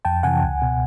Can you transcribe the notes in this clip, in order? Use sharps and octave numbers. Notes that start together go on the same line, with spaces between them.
F2 G5 A5
C3 E3 F#5 G#5
C#2
B2